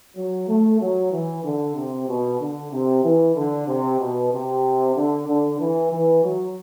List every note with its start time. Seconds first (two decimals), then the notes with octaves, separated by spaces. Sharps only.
0.17 F#3
0.49 A3
0.80 F#3
1.12 E3
1.44 D3
1.76 C3
2.08 B2
2.40 D3
2.72 C3
3.04 E3
3.35 D3
3.68 C3
3.99 B2
4.32 C3
4.95 D3
5.27 D3
5.59 E3
5.91 E3
6.24 F#3